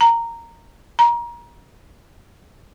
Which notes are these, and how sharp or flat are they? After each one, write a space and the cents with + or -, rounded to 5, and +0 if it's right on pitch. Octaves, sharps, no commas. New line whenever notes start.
A#5 -10
A#5 +25